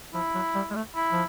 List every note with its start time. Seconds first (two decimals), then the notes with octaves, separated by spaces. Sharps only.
0.14 F3 E4
0.35 F#3
0.55 G3
0.71 G#3
0.76 A3
0.95 E4
1.12 F3